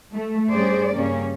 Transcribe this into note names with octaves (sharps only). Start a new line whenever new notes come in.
A3
G2 G3 C#4 G#4 C5 D5
G2 C#3 G3 A#3 C#4